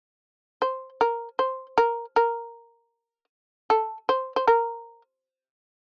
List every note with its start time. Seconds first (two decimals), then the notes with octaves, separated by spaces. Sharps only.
0.62 C5
1.01 A#4
1.39 C5
1.78 A#4
2.16 A#4
3.70 A4
4.09 C5
4.36 C5
4.47 A#4